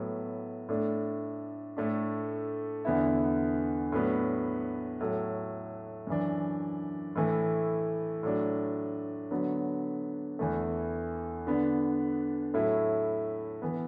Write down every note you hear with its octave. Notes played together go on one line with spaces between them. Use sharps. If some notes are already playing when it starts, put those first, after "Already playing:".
Already playing: A2 F#3 B3
A2 A3 D4
A2 A3 D4
E2 D3 B3 E4
A2 F#3 B3 D4
A2 F#3 A3
F#2 E3 D4
A2 E3 A3
A2 F#3 D4
D3 F#3 B3
E2 E3 A3
D3 B3 D4
A2 F#3 A3 E4
E3 B3